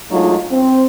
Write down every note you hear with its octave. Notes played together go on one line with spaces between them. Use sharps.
F#3 G#3 A3 D4 D#4 F4
C4